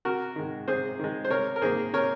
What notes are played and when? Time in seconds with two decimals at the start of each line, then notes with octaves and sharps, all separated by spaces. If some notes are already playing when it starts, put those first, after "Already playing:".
0.05 C3 F#4 A#4
0.36 D#3 G#3
0.68 C3 G#4 C5
0.99 D#3 G#3
1.25 C5
1.30 C3 A#4 C#5
1.56 A#4
1.61 D#3 A#3 G#4 C5
1.93 C3 A#4 C#5